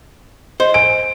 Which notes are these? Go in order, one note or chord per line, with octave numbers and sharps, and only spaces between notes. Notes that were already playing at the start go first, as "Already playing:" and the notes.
C5 D#5
G#5 D7